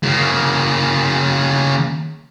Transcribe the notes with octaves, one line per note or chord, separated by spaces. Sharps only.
C#3 A#3